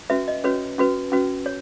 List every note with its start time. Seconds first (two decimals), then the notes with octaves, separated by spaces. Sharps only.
0.10 C#4 F#4 B4 E5
0.28 D#5
0.44 C#4 F#4 B4 C#5
0.78 C#4 F#4 B4
1.12 C#4 F#4 B4
1.46 C#5